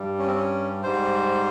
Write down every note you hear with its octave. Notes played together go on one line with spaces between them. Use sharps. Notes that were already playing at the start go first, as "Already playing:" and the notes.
Already playing: G2 G3
C#4
C4
C#4
G#2 G3 C5